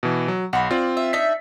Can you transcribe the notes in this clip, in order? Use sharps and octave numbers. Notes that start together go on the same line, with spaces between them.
B2 E3
F#3
B1 F#4 B5 C6
C4 F4 D5
E5
D4 D#4 E5 B6